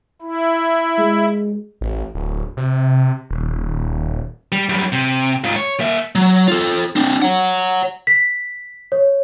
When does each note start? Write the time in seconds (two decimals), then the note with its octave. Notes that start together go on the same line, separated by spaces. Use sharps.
0.22 E4
0.99 G#3
1.81 A1
2.15 D1
2.57 C3
3.31 D#1
4.52 G3
4.69 F#2 G3
4.93 C3
5.44 G#2 F4
5.56 C#5
5.80 A#3 E5
6.15 F#3
6.48 F4 A4
6.96 C4 D4
7.22 C#5 F#5
8.07 B6
8.92 C#5